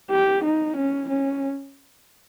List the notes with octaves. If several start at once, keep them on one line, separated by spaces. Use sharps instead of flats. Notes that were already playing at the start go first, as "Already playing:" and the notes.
G4
D#4
C#4
C#4